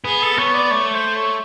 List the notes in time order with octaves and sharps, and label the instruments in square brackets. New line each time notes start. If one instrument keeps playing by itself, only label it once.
[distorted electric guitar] B3 [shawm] G#4
[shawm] A4
[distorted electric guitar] B3 [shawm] C#5
[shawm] D5
[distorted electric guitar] A3 [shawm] C#5
[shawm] C5
C#5